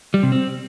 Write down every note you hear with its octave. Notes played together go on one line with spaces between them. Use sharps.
G3
C3
C4